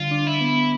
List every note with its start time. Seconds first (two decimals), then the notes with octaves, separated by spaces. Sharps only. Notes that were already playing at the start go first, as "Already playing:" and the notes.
Already playing: D3 G3 F4
0.11 D4
0.26 E4
0.41 B3